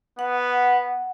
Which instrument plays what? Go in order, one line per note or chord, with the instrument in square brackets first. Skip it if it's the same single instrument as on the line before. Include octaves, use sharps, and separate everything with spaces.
[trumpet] B3 [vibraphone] F#5